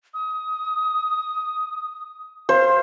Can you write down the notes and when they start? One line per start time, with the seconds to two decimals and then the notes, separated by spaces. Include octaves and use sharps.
0.14 D#6
2.49 C5 F5